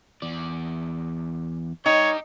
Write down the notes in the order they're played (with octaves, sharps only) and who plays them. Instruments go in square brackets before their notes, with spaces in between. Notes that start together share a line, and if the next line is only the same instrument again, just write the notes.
[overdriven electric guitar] E2 D5
[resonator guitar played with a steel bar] D#4 [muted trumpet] C#5 [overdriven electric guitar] D5 G5